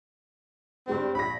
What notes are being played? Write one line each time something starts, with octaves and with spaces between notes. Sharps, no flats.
G2 G3 G#3 C4
A#1 B5 A#6